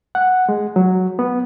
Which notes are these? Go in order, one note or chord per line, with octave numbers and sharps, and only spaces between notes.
F#5
G#3
F#3
B3